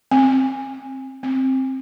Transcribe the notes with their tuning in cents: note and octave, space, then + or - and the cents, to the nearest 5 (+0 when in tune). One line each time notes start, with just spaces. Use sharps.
C4 +25
C4 +15